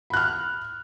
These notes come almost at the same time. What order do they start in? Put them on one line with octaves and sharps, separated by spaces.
B5 F#6 F6